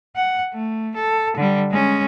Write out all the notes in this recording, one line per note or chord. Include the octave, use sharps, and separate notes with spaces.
F#5
A3
A4
D3 G3
G#3 C#4